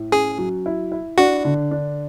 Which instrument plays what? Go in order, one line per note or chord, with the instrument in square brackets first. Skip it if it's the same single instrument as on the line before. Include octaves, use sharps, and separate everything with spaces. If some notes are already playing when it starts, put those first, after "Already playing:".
Already playing: [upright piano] A2
[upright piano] C#4 [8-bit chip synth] G#4
[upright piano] F#3
E4
E4
[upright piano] D4 [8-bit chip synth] F#4
[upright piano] D3
D4